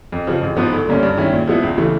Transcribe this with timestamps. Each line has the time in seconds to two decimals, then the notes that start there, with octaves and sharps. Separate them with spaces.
0.12 F2
0.27 C#3 F3
0.42 A1
0.57 G#2 F3 G#3 B3
0.72 D2
0.87 D3 G3 A#3 C#4
1.03 G2
1.17 D#3 G#3 C#4 E4
1.33 A#2
1.47 F3 G#3 B3 E4
1.63 C#2
1.78 C#3 E3 A3